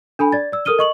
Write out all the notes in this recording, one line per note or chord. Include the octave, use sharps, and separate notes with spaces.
D4 A4 G#5 B5
D5 A6
D5 E6
A4 A#4 D#6 F6 D#7 G7
D#5 C#6 F#7